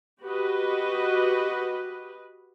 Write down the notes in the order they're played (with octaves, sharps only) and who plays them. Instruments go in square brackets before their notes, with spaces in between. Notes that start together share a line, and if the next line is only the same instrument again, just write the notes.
[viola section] F#4 G4 B4 D#5